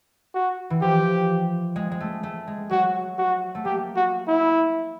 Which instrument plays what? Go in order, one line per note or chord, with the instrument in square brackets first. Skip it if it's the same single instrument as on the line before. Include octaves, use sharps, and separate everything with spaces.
[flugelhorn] F#4
[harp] E3
[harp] F3 [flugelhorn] G4
[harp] G#3
G#3
A3
A3
G#3
[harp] F#3 [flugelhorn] F#4
[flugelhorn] F#4
[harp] A3
[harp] A#3 [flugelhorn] G4
[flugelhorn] F#4
E4